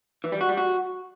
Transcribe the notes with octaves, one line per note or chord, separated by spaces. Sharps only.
E3
G3
F#4
G3
F#4